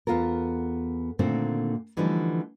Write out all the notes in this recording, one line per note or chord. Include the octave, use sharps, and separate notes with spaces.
E2 B3 F4 A4 A#4
A#2 D3 D#3 A3 A#3 C4
D3 E3 F3 G3 A3 D#4